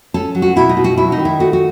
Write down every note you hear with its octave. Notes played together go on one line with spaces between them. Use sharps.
C#4 A4
F#3
F#4
B2 E4
D#4
B2
F#4
F#3 E4
D#4
D#3
E4
A3 F#4
F#4